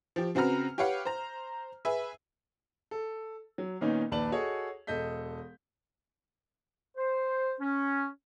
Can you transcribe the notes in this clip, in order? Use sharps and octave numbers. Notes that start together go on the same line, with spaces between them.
F3 G4
C#3 C4 F#4 B4 A#5 F6
G4 B4 C#5 F5 F#5
C5 A#5
G#4 B4 E5
A4
F#3
A#2 D#3 A#3 B3 C#4 D#4
A#1 D#2 B4 D5 A5 F#7
F#4 G#4 A4 C#5 D#5
E1 A4 D#5 G6 B6
C5
C#4